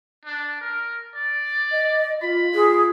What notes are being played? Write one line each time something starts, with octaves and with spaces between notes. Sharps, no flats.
D4
A#4
D5
D#5
F4 B5
F4 G#4